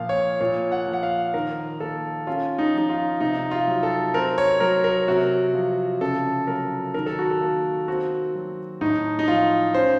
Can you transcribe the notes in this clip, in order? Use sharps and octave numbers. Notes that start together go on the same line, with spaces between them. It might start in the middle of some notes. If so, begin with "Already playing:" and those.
Already playing: A#2 F3 F5
C#5
A#2 C#5
F#5
F3
F#5
F5
D#3 A#4
A#3 A4
C#4 F4
D#4
F3 D#4
F4
C3 D#4
F4
F#3
A4
C4 A#4
C#5
F#3 A#4
A#4
C3 F#4
F3
C#3 A4
F#3 A#4
D#3 A#4
A4
F#4
A4
A#3
C4 F#4
F#3
A2 D#4
D#4
F3 F4
C#4 C5